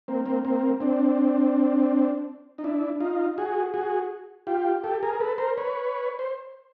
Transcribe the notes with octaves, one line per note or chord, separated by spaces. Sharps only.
A#3 C4
A#3 C4
A#3 C4
C4 D4
D#4
D4 E4
D#4 F4
F#4 G#4
F#4 G#4
F4 G4
G4 A4
G#4 A#4
A#4
A4 B4
A#4 C5
B4 C#5
C5